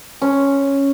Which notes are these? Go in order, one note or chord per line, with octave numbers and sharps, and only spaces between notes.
C#4